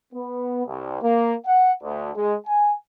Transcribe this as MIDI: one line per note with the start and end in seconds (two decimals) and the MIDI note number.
0.13 0.65 59
0.66 1.00 36
1.02 1.35 58
1.46 1.72 78
1.82 2.10 38
2.15 2.35 56
2.46 2.73 80